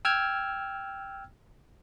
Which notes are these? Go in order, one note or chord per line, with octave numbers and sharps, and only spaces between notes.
G5 E6 F6 G#6